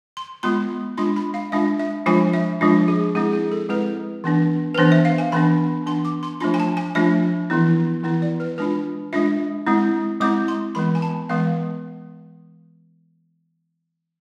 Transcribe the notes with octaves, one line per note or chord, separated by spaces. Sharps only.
C6
G#3 B3 F4 C6
G#3 D4 F4 C6
B5
F5
G#3 D4 F4 E5
E5
F3 G#3 D4 F4 G#5
E5
F3 G#3 D4 F4
G#4
G#3 C4 E4 G#4
G#4
A4
G#3 C4 E4 B4
E3 B3 D4
B4
E3 B3 D4 C5
E5
F5
G#5
E3 B3 D4 B5
E3 B3 D4 C6
D6
C6
F3 A3 D4 F4 C6
G#5
A5
G#5
F3 A3 D4 F4 E5
E3 B3 E4
E3 B3 E4
D5
B4
G#3 D4 F4 B4
G#3 D4 F4 E5
G#3 C4 E4
G#3 C4 E4 D6
C6
E3 G#3 B3 B5
G#5
A5
E3 G#3 B3 F5